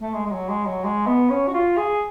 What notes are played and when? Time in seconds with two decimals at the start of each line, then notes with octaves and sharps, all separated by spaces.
0.02 A3
0.14 G#3
0.26 G#3
0.31 F#3
0.49 G#3
0.66 F#3
0.84 G#3
1.07 B3
1.30 C#4
1.47 F#4
1.54 F4
1.77 G#4